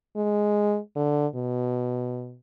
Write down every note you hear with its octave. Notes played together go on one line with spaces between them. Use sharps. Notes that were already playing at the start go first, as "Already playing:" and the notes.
G#3
D3
B2